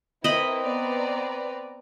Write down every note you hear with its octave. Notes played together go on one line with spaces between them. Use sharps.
C4 E4 A#4 B4 D#5 B5
B3 D5 A#5